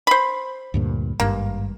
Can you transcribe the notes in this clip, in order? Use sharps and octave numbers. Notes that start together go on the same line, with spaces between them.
C5 B5
D2 G2 A#2
G#1 G2 A#3